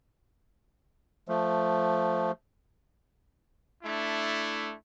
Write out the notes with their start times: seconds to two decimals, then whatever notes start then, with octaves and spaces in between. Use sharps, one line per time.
1.28 F3 A3
3.83 A3 D4 E4